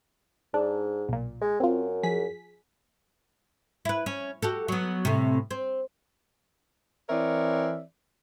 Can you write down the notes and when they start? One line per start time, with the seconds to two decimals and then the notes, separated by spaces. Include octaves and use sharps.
0.54 G#2 D4
1.09 B1 A#2
1.41 G#3
1.60 F#2 C4 F4
2.03 F3 G#4 B6
3.85 E4 B4
4.06 C#4
4.42 F#4 G4 A4
4.68 F#3 B3
5.05 A2 C3
5.51 C4
7.10 E3 C4 A#4 C#5 D5 E5